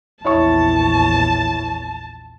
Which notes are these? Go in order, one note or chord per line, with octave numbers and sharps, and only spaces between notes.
A#1 E2 E4 C#5 A5 C#6